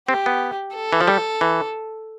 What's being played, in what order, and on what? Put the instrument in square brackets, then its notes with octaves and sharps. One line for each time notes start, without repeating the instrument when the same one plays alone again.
[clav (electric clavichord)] C4 [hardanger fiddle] G4
[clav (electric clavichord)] B3
[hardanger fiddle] A4
[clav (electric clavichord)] E3
F3
G3
E3